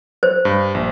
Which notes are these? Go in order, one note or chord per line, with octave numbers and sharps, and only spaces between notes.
C5
G2
A#1